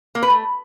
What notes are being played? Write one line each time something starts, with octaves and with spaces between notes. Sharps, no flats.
A#3
B4
A3